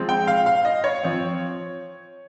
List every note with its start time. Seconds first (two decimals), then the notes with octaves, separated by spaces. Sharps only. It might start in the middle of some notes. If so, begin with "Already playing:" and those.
Already playing: F3 G#3 C4
0.09 G5
0.27 F5
0.46 F5
0.65 D#5
0.84 C#5
1.03 F3 C4